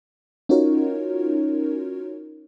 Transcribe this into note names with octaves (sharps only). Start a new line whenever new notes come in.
C#4 D#4 F4 F#4 A#4 C#5